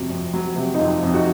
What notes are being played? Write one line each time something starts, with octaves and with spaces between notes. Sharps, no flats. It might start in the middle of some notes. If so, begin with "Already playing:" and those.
Already playing: F2 C3 F#3 F4 F#4
F2
F#3
C3
D#4
F2 F4
F2
D#4 F#4